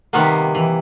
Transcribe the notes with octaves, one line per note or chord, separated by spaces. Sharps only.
C3 D#3 G3 A#3 B3
E3